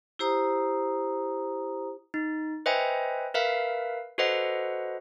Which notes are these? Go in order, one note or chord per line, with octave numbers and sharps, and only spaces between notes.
E4 G4 C5 A#5 D#6
D#4
B4 C5 D#5 E5 G5 G#5
A#4 B4 E5 F5
F#4 A4 B4 C5 D#5 F#5